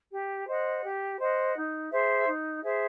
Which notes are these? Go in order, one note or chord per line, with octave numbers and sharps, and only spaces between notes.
G4
C5 D#5 F#5
G4
C5 D#5 F#5
D#4
G#4 C5 E5
D#4
G#4 C5 E5